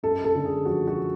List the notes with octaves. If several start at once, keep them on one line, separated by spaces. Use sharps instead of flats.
F#2 A4
A4
D3
G#4
F3 F#4
F#4